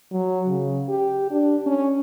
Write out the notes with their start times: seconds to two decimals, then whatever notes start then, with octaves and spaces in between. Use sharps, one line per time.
0.12 F#3
0.48 C#3
0.89 G4
1.31 D4
1.66 C#4